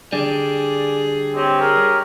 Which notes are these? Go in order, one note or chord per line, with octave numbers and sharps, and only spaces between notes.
D3 G3 G#4 D5
C4 G4 C#5 D#5
G#4 A#4